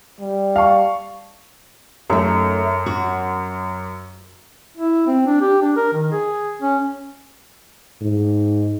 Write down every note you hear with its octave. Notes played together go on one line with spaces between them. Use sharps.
G3
F5 A5 C#6
F#2 A3 D#4
F#4
E4
C4
D4
G4
D4
A#4
D#3
G#4
C#4
G#2